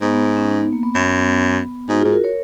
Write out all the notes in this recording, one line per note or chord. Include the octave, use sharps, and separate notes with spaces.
G#2 B3
B3
B3
C#4
D#4
B3
A#3
B3
F#2
G#2 D#4 F#4
G#2 F4 G#4
F#4 A#4
A#4 C#5